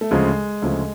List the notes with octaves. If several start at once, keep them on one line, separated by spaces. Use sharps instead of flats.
A3
D2 C#3 F3 G#3
D2 C#3 F3